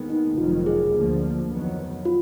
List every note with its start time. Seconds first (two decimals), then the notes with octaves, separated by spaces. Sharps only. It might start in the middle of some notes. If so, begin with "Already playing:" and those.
Already playing: D#2 D#3 G#3 B3
0.10 D#4
0.38 F1 F2 D#3 F#3 F4
0.66 G#4
0.94 D2 D3 F3 A#3
1.50 F2 D#3 F#3 B3
2.05 F4